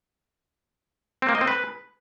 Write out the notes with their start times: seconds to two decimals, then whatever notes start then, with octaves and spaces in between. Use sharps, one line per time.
1.22 C4
1.29 A#3
1.35 D#5
1.41 C4
1.47 B4